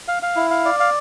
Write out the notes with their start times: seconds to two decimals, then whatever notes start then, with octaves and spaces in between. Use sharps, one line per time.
0.08 F5
0.23 F5
0.36 E4
0.50 F5
0.65 D5
0.80 F5